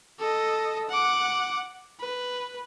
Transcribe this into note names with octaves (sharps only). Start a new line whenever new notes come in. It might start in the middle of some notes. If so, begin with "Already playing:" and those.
A4 D#5
F#5 D6
B4